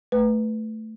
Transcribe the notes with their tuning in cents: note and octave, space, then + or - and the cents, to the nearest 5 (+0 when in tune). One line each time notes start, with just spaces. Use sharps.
A3 +0 B4 +0